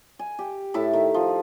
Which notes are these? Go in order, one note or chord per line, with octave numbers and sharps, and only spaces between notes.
G#5
G4
A2 E4 E5 A5
D#3
F3